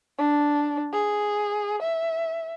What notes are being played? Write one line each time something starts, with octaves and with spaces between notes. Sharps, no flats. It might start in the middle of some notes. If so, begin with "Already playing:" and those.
D4
G#4
E5